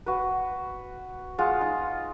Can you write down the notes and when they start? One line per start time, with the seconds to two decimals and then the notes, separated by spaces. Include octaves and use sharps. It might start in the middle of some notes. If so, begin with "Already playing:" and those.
0.06 F#4 B4
1.38 G#3 F4 F5 F#5
1.61 D#4